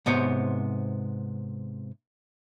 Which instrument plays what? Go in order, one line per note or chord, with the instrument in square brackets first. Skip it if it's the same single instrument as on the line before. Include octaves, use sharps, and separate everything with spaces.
[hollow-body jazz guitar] G#2 C3 B3 C5 C#5